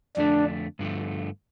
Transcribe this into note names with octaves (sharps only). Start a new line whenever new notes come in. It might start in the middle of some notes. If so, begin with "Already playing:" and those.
F2 D3 A3 D4
G2 D3 F3 A3